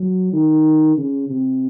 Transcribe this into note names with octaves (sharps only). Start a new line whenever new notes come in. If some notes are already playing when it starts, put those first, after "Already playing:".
Already playing: F#3
D#3
C#3
C3